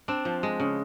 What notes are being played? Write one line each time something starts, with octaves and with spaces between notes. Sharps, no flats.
C4 D4
F3
G#3
C#3